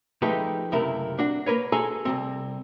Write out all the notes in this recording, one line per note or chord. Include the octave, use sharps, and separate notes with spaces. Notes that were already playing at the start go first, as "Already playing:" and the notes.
F3 G#3 A3 D#4 G4 B4
C#2 F#2 C3 A3 E4 A#4
D4 F#4 F#5
A#3 A#4 B4 C#5
F#4 G#4 A4 G#5 A#5 C6
C2 C3 C4